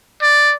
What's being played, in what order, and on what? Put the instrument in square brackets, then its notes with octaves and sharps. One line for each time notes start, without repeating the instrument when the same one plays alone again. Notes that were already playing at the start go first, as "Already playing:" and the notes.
[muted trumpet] D5